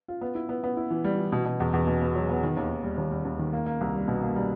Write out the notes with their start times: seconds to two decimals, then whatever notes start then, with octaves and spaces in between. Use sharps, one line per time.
0.08 F4
0.21 B3
0.35 E4
0.49 B3
0.64 B3
0.77 E4
0.90 E3
1.04 G3
1.18 E3
1.32 B2
1.45 B2
1.60 E2
1.73 E2
1.87 B2
2.02 B3
2.16 F#3
2.29 B3
2.43 D#3
2.57 D#2
2.70 D#3
2.84 G3
2.98 D#2
3.11 G3
3.25 D#2
3.39 D#3
3.53 A#3
3.66 A#3
3.81 C2
3.95 G3
4.08 B2
4.22 A#3
4.36 G3